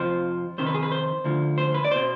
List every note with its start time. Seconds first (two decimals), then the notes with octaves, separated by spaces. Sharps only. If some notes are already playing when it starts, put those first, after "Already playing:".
Already playing: F2 C3 F3 C5
0.58 F2 C3 D#3 C5
0.67 B4
0.74 G#4
0.83 B4
0.92 C5
1.24 D2 D3 F3
1.58 C5
1.74 B4
1.85 D5
1.91 B2 C5